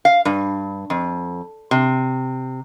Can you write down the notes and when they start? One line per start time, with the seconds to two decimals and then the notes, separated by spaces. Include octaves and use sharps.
0.05 F5
0.25 G2
0.90 F2
1.71 C3